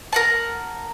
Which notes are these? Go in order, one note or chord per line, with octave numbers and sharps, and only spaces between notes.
A#4 F#5 A5